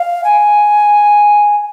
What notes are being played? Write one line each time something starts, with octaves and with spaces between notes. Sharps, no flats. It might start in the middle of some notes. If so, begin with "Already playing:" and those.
Already playing: F5
G#5